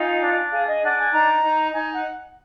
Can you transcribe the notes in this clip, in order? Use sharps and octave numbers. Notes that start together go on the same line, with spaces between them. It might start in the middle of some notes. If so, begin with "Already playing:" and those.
Already playing: D#4 F4 G#5
D4
G#4 F5
D#5
D4 F#5
G#5
D#4 A#5
D#4
D#4 G#5
F#5